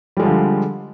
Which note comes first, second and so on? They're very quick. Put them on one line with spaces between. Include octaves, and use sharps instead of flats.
G3 G#3 F3 D3